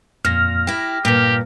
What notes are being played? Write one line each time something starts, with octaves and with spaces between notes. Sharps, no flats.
F2 A#2 F6 A#6
E4 G4 G5
G2 A#2 G4